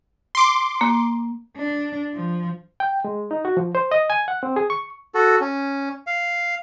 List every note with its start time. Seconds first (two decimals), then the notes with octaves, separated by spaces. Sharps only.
0.35 C6 D6
0.81 A#3
1.57 D4
2.15 F3
2.80 G5
3.04 G#3
3.31 D#4
3.45 F#4
3.57 F3
3.75 C5
3.91 D#5
4.10 G#5
4.28 F#5
4.43 C4
4.56 G#4
4.70 C#6
5.15 F#4 A4
5.41 C#4
6.07 F5